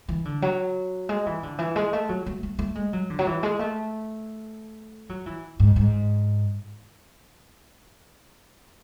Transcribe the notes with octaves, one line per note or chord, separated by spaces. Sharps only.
E3
D3
F#3
G#3
E3
D3
E3
G#3
A3
F#3
A3
A3
A3
G#3
F#3
D3
F#3
E3
G#3
A3
F#3
E3
G#2
G#2